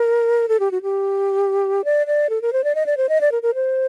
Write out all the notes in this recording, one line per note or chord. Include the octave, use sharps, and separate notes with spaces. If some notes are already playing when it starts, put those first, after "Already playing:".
Already playing: A#4
A4
G4
F#4
G4
D5
D5
A4
A#4
C5
D5
D#5
D5
C5
D#5
D5
A#4
A#4
C5